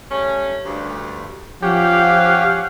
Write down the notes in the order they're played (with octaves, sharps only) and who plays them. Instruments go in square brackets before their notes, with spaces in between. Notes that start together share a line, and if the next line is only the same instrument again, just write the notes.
[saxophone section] G3 A3 C#4
D2 G2
[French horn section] F3 [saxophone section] C#4 F#5 [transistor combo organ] G4 [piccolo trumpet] F5